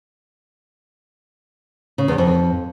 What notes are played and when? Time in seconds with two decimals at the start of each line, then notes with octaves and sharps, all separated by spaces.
1.98 C#3
2.08 E2
2.18 F2